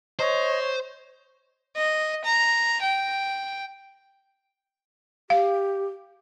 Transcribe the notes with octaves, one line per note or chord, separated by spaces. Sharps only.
C5 C#5 D#5
D#5
A#5
G5
G4 F5